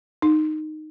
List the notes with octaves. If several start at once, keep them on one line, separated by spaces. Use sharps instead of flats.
D#4